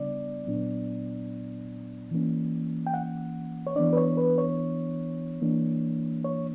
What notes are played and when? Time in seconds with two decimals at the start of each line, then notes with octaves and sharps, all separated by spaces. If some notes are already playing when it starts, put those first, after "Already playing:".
Already playing: C#3 G3 B3 D4 D5
0.47 A#2 F#3 B3 D4
2.11 E3 A#3 C#4
2.87 G5
2.94 F#5
3.67 C#5
3.76 E3 B3 D4 D5
3.93 B4
3.97 C#5
4.17 B4
4.38 C#5
5.42 E3 A#3 D4
6.24 C#5